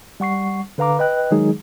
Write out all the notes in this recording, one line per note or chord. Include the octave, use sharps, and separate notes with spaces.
G3 F#5 C#6 C7
D3 B4 F5 A#5 D6
B4 D#5 G5 F#6
D#3 F#3 G#3 D#4 G#4